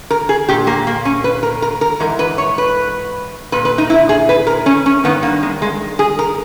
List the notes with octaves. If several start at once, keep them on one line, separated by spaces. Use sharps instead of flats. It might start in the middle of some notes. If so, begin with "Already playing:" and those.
A#4
G#4
A#2 G4
A#3
A#3
C#4
B4
A#4
A#4
A#4
G#2 E3 A#4
B4
C#5
B4
A#2 B4
B4
D#4
E4
G#4
B4
A#4
C#4
C#4
G2 D#3 B3
A#3
G#3
G#3
G#4
A#4